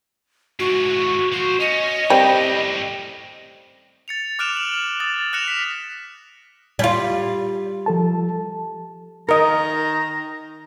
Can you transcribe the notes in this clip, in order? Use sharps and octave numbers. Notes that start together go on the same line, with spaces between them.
G#2 E3 F#4
A#3 F#4 C5
C#4 D#5
A2 G3 C4 G4
A6 C#7 F7
D6 F6 F#6 D7 E7 F7
F#7
D#6 A6
F6 F#6 A#6 C#7 E7 F7
B6
G3 F4
F3 A4 A5
D#3 A#4 D#5 A#5